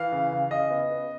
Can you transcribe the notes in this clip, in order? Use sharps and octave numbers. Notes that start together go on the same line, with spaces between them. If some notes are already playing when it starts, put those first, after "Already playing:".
Already playing: E3 F5
C#3
C#3
C#3 D#5
B3
B3